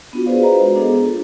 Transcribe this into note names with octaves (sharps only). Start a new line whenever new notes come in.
B3 D4 F4 F#4
G#4 B4 C5 D5 F5
F#4 B4 C5 D#5 A#5
G#3
B3 D4 G#4 A4
F4